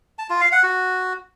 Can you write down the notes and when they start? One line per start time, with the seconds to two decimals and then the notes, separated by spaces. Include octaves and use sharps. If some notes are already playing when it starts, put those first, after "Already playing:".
0.19 A5
0.30 F4
0.41 F5
0.52 F#5
0.63 F#4